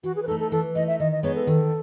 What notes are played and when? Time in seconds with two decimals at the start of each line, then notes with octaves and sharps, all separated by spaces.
0.03 E3 F#4
0.16 G#4
0.22 B4
0.28 A3 D#4 A4
0.40 A4
0.52 E3 A4
0.75 A3 D#4 D#5
0.87 E5
1.00 D#3 D#5
1.12 D#5
1.23 G#3 B3 D#4 G#4 C#5
1.36 A4
1.47 D#3 A4